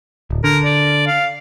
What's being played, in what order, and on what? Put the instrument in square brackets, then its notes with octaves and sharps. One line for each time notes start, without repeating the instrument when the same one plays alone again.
[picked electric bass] D1
[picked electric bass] D3 [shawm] A#4
[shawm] D5
F5